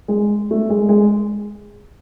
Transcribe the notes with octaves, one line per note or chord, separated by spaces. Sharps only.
G#3
A3
G#3
G#3